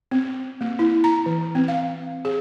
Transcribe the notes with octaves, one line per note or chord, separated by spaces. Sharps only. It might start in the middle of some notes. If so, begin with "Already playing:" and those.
C4
A#3
E4
A#5
E3
C4
F5
G#4